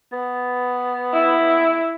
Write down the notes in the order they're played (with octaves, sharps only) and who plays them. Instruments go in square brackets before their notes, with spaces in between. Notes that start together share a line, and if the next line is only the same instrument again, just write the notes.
[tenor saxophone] B3
[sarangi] E4